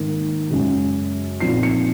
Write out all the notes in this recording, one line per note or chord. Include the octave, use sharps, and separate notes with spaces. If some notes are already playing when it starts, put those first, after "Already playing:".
Already playing: G#2 D#3 A#3 D#4
F#2 C#3 G#3 C#4
A#1 A#2 F3 C4 D#4 C7
C#7